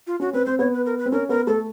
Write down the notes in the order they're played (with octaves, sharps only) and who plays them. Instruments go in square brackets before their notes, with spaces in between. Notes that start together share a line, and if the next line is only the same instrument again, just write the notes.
[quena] F4
[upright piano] C#4 [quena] F#4
[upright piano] C4 [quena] B4
[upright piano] C4 [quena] C5
[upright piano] B3 [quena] C#5
[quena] B4
A#4
B4
[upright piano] C4
[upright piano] C#4 [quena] A#4
[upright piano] B3 [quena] A#4
[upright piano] A3 [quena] A4